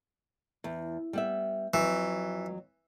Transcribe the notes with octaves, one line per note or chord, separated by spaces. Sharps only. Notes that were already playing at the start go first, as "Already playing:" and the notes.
E2
G3 B3 E5
F2 E3 F#3